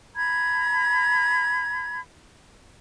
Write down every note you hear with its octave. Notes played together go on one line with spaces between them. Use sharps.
A#5 B5 G#6